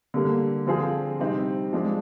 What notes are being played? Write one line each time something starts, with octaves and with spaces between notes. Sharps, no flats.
D3 G3 A#3
D3 F3 C4 F4 G#4
C3 G3 C4 D#4
F3 G#3 D4